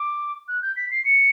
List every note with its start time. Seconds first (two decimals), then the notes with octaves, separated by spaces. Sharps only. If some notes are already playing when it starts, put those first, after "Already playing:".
Already playing: D6
0.48 F#6
0.62 G6
0.76 B6
0.91 C7
1.05 C#7